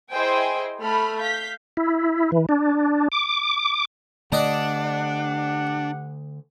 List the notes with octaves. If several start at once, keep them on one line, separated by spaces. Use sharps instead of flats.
E4 G#4 C5 D#5 G5 G#5
A3 B5 F6
F5 G6 B6
E4
E3
D4
D6
D3 A3 D4 G4 D5 D#5 F#5 A5